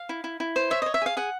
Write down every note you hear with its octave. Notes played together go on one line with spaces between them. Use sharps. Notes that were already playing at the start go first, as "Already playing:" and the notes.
Already playing: F5
E4
E4
E4
C5
C#5 E5
C#5 D#5
E5
G#4 F5
G#4 F#5